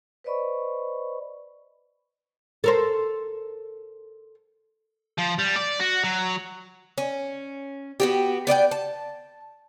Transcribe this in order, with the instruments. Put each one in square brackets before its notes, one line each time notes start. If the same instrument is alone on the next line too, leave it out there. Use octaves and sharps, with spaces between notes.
[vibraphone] B4 C5 D5 D#5 B5 C#6
[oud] A4 A#4 C5
[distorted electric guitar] F3
G3
D5
F#4
F#3
[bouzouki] C#4
B3 F#4 G4
B3 D5 D#5 G5
A5